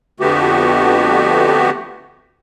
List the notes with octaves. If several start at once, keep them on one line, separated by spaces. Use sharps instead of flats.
F2 D3 A3 B3 F#4 G4